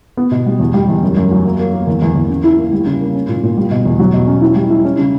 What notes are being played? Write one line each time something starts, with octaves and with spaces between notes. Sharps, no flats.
B3
B2
G3
E2
G3
E2
F#2
F#2
F#3
A#3
A#3
A#3
E2
E2
E2
C#4
E4
A#3
G3
C#3
A#3
C#4
A#2
A#2
G3
B2
E2
F#3
B2
C#4
E4
G3
E4
C#4
C#3